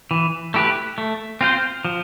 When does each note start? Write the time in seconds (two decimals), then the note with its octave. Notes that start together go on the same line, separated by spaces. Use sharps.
0.11 E3
0.54 A3 E4 G4 B4
0.98 A3
1.41 C4 F4 C5
1.85 F3